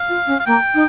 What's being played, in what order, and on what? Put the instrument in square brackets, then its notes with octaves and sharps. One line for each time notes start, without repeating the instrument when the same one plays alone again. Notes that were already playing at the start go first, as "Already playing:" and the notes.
Already playing: [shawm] F5
[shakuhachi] F4
C#4
[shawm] F5
[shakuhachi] A#3 [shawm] G5
[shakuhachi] D#4